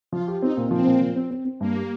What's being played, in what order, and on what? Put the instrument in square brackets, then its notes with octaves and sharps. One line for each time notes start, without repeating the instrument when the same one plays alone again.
[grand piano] F3 [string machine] F4
[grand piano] G4
[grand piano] C4 [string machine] D#4
[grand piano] A#2
[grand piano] F3 [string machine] C4
[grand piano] A#2
F3
C4
C4
C4
[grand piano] G2 [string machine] A#3
[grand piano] G3